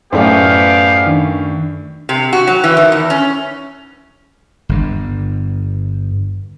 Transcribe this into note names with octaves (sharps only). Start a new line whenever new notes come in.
F#2 A2 A3 B3 G4 C5 D5 F5
D#3 D4
C3
F#4
F#3
E3
D#3
E2
C#4
G1 G2